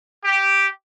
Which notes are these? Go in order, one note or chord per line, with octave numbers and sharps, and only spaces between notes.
G4